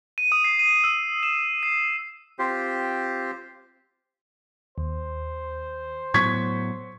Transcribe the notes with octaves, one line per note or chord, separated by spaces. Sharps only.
D#7
D#6
C7
D#7
E6
E7
C7
C4 F4 G4 C5
D#2 C5
A2 F#3 B3 C#6 G#6 B6